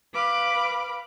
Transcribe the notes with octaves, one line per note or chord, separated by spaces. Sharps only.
B4 F5 B5 D6